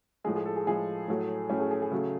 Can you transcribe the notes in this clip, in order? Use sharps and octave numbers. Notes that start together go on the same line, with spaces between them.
A2 F3 G#3 G#4
G#4
A4
G#4
A2 F3 G#3 G#4
A2 F#3 A3
A2 F#3 A3 C#4
G#4
G#4
G#4
C#3 F#3 A3